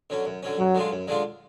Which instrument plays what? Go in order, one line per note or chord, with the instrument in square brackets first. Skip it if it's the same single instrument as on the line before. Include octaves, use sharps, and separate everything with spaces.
[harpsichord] D3 F#3 C#4
F#2
D3 F#3 C#4
[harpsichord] F#2 [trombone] F#3
[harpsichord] D3 G#3 D4 F4
F#2
D3 G#3 D4 F4